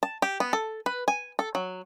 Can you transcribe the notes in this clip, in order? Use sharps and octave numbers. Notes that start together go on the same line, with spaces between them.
A5
G4
B3
A4
B4
G#5
A4
F#3